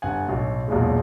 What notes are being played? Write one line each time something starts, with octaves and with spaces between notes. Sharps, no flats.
G1 F#5 G#5
B1 A2
B1 E2 A#2 G#3